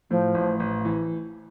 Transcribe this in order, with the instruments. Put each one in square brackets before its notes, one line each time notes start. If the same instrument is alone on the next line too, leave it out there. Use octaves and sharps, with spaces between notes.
[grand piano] A2 [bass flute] F3
[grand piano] A1
A1
E3